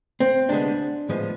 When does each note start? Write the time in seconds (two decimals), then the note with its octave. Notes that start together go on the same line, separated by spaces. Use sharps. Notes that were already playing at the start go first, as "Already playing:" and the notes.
0.20 C4
0.49 D2 C3 F3 G#3 B3 D4
1.09 A2 F3 G#3 B3